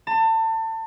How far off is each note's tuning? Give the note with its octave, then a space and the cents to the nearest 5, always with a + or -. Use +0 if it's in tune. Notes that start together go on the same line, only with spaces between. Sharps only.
A5 +30